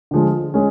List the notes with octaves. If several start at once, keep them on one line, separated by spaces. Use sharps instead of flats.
D3 F3 G#3
G#3 C#4